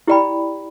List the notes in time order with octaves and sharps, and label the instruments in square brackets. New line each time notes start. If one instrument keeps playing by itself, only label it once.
[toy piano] E4 G4 D5 G5 B5